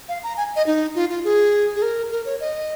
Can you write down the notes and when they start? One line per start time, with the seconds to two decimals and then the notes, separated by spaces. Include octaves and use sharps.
0.09 F5
0.23 A#5
0.37 G#5
0.56 D#5
0.67 D#4
0.95 F4
1.09 F4
1.24 G#4
1.76 G#4
1.82 A#4
2.11 A#4
2.25 C#5
2.40 D#5